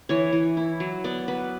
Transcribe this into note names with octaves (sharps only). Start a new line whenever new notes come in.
E3 C#5
E3
E4
F#3
B3 D5
F#3 B4